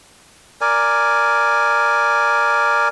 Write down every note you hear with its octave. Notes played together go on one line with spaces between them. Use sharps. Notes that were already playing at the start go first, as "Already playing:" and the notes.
A#4 D5 G#5